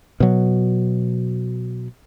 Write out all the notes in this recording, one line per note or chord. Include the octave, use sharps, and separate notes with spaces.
B2 F#3